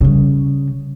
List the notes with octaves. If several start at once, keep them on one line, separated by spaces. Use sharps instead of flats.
C#3 G3